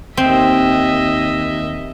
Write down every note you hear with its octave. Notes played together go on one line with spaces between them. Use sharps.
D#2 C4 D#5 E5